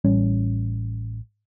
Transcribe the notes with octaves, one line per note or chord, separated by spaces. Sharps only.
A1 G3 C#4